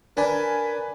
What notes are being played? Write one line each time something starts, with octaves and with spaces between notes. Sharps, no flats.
D4 A#4 B4 G#5 B5